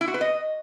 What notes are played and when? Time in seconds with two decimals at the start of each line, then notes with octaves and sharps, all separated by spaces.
0.01 E4
0.08 F#4
0.14 B4
0.21 D#5